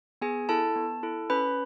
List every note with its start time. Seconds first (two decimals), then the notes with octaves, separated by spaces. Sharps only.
0.21 B3 G#4 G#5
0.49 E4 A4 A5
0.76 B3
1.03 E4 A4
1.30 C#4 B4 B5